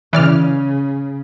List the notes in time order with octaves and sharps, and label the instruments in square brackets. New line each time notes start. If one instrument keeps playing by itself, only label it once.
[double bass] C#3 [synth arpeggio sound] E3 D5 F6